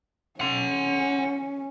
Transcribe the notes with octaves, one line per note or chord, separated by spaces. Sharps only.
C#4 F#5 C6